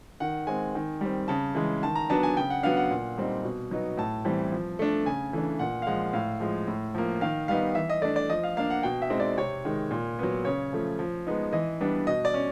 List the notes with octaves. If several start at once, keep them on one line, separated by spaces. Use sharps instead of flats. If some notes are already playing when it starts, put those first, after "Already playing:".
D#3 F#5
G#3 C4 G#5
D#3
G3 C4
C#3 A5
E3 G#3
D#3 A5
A#5
F#3 B3 D4 A5
G#5
C#3 G5
F#5
F#3 B3 D4 F5
F#5
A#2
G3 C4 D#4
B2
F#3 B3 D#4
A2 A5
E3 G3 C4
F3
A3 D4
C#3 G#5
E3 A3 D4
A#2 F#5
F5
F3 G#3 F#5
A2 F5
F3 G#3
A2
F3 A#3
D#3 F5
G3 B3 D#4 F5
E3 E5
D#5
A3 D4 D5
D5
F3 D#5
F5
A#3 D4 F5
F#5
B2 G5
E5
G#3 C4 D#4
D5
C3 C#5
D#3 G#3
A#2
F#3 B3
C#3 C#5
F3 A3
F3
G#3 B3 D#4
E3 D#5
G3 B3 D4
B2 D#5
D5
C#4